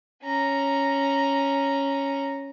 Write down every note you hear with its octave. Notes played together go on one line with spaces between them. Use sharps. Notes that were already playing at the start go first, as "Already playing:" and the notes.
C#4 A#5